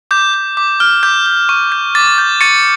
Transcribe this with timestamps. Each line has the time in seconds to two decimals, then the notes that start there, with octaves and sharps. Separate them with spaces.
0.11 D6 G6
0.34 G6
0.57 D6
0.80 F6
1.03 D6 G6
1.26 G6
1.49 C#6
1.72 G6
1.95 D6 A6
2.18 G6
2.41 C#6 A6 C#7